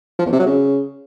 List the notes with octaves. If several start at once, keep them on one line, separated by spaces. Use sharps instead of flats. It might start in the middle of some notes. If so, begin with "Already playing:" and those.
F3
E2
C3
F#3
C#3